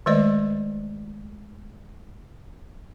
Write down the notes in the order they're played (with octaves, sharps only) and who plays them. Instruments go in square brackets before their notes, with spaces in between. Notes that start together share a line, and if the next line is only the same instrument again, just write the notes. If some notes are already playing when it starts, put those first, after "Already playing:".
[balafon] D#3 G#3 A3 C5 D5 D#5